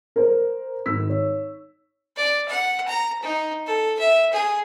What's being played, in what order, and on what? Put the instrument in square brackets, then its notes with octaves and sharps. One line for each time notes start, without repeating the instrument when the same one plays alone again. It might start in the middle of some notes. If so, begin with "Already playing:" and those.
[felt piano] A#4 C5
G#1 E6 B6
C#5
[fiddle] D5
F#5
A#5
D#4
A4
E5
G#4